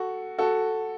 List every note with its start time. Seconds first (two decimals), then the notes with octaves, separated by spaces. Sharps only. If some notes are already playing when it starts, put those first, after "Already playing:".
Already playing: F#4 A4
0.38 F#4 A4